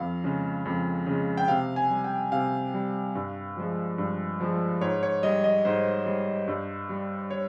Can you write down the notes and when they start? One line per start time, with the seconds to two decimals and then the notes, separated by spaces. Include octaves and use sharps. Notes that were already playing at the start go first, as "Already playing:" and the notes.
Already playing: F2 F5
0.24 C#3 G#3
0.65 F2
1.06 C#3 G#3
1.38 G5
1.48 C3 F5
1.76 G#5
1.90 G3
2.04 G5
2.32 C3 F5
2.74 G3
3.15 G2
3.57 F3 G#3
3.98 G2
4.40 F3 G#3
4.81 G#2 C#5
5.03 C#5
5.23 G3 D#5
5.44 D#5
5.65 G#2 C5
6.06 G3
6.48 G2
6.89 G3
7.31 C#5